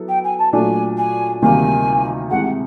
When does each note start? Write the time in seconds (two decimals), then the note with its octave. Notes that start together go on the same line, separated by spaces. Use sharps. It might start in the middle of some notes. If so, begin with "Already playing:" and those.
Already playing: F#3 B3 E4 A4
0.08 G5
0.24 G#5
0.39 A5
0.53 A#2 F#3 A3 D4 G#5
0.97 G#5
1.42 D2 C3 D#3 G3 A#3 G#5
2.30 C2 C3 E3 G#3 F#5